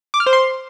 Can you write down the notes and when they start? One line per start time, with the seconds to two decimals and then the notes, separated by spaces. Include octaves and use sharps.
0.14 D6
0.20 F6
0.26 C5
0.33 C6